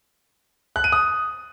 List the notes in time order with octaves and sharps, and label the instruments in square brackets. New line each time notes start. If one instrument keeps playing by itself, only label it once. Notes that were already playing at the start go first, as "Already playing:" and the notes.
[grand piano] F#6
D#7
D#6